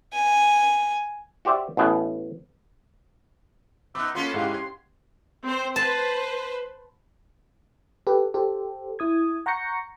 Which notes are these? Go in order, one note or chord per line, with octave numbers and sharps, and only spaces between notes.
G#5
F#4 G4 C5 D5 E5
A1 B2 B3 G#5
B3 D#4 E5 D6 F#6
A#3 B3 C#4 F4 A4 C6
G#2 C3 E4 G4 G#4 F5 F#5
G#6
C4 C5
B4 C5 A5
G4 A4 B4
G4 A4 C5
E4 D#6 G#6
F#5 A#5 C#6 G6 A#6 C#7